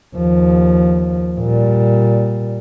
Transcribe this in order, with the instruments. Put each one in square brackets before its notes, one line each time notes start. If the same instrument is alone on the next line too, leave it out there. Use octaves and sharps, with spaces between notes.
[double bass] D#2 F3
A#2 G3